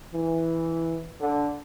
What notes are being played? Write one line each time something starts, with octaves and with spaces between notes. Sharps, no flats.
E3
D3